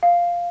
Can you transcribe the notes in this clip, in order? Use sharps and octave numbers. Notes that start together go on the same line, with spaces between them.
F5